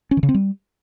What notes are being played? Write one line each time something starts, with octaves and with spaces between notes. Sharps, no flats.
C#4
D#3
C#3
C4
G3